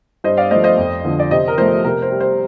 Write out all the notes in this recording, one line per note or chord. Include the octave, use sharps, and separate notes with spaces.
G2 C5 D#5
D5 F5
F3 A3 C5 D#5
C5 D#5
F2
D3 F3
D5
C3 C5 D#5
A#4
F3 A3 C5
C3 A#4
C5
G3
C5